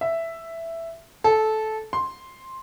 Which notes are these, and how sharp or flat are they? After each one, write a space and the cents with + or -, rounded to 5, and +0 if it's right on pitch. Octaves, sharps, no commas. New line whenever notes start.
E5 +5
A4 -15
C6 +5